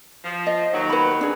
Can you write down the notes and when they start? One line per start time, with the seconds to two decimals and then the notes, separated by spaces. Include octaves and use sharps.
0.24 F3
0.47 D#5
0.73 D#2 F#3
0.90 B4 B5
1.21 D4 G#4